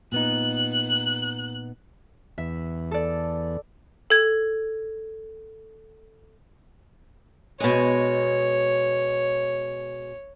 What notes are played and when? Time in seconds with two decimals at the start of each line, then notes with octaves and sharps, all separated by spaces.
0.12 A#2 B3 D#4 F#6
2.38 E2 E5
2.91 A4 D5
4.10 A4 G#6
7.60 B2 G#3 C#5